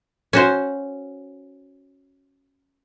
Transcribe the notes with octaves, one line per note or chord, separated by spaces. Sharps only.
C#4 F#4 C5